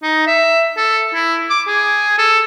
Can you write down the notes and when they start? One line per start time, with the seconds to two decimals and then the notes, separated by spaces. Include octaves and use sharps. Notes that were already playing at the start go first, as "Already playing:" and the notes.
0.03 D#4
0.27 E5
0.77 A4
1.14 E4
1.50 D6
1.67 G#4
2.18 A4